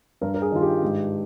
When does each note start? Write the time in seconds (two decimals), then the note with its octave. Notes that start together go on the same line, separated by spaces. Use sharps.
0.21 G2 A#4
0.34 A#4
0.42 G#4
0.52 D#3 F4
0.61 G4
0.83 G#2